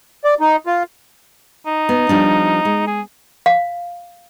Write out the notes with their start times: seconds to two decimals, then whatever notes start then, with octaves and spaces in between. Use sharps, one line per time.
0.24 D5
0.40 D#4
0.66 F4
1.67 D#4
1.89 B3
2.09 F3 G3 D4
2.65 G#3
2.87 G#4
3.46 F5